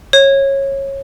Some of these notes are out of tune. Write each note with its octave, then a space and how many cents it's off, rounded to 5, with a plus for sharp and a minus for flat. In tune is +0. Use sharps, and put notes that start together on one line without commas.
C#5 -20